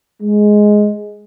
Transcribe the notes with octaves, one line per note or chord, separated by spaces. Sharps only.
G#3